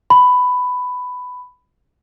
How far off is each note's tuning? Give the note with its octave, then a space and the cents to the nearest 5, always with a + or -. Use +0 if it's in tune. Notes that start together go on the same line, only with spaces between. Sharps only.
B5 +10